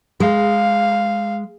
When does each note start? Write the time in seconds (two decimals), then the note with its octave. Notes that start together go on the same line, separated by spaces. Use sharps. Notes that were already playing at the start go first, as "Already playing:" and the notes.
0.20 G#3 F5